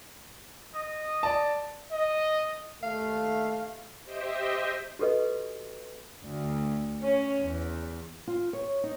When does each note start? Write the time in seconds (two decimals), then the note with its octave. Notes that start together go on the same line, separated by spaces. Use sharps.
0.75 D#5
1.23 D5 A5
1.92 D#5
2.83 D#2 A3 F5
4.04 G4 C5 D#5 E5 G5
4.99 F#4 G4 A4 B4 D#5
6.25 D2
7.02 C#4
7.42 E2
8.27 F4
8.53 C#5
8.84 D#4